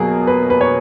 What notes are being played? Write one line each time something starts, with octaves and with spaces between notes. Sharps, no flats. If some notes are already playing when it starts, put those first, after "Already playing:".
Already playing: B2 F#3 A#3 G#4
B4
B4
C#5